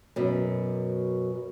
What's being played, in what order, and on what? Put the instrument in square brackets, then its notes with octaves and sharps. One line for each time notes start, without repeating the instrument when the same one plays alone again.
[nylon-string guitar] F#2 B2